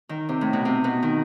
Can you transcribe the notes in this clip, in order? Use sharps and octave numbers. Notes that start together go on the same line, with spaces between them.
D#3
C3
A2
B2
C3
B2
D#3